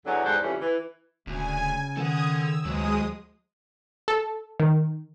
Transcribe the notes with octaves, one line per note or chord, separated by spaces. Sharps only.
E2 D3 F#3
E2 G#2 G3 A4 C5 F#5
F2 C#3 E3 G3 A3 C#4
E3
D#1 D2 C#3 G#5
D#3 A4 F#5 D#6 G#6
E6
D2 D#3 F#3 G#3 D#6
A4
D#3